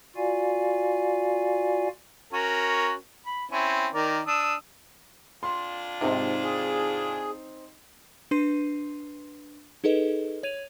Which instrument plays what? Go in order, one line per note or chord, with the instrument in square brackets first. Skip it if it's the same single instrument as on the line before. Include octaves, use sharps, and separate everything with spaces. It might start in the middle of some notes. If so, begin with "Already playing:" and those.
[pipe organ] F4 F#4 D5 F5 G#5
[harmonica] C#4 F#4 A#4
B5
C4 C#4 E4
D#3 A#4 D5
D4 D#6 E6
[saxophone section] F2 D4 F4 [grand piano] C6
[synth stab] G#2 C3 [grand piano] C4 D#4
[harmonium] G#4
[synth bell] D4 B4 C6 C7 D#7
D#4 G#4 A4 B4 D#5
C#5 G#6 D#7 F7